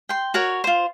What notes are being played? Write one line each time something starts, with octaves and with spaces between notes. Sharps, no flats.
G5 C6
F#4 A#4 C#5
F4 C5